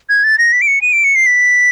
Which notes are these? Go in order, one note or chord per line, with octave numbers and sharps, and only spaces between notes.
G#6
A6
A#6
B6
D7
C#7
D#7
D7
C#7
C7
B6